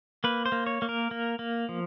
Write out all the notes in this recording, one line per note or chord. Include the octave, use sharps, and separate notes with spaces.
A#3 B4
C5
A#3
C#5
A#3
A#4
A#3
A#3
F3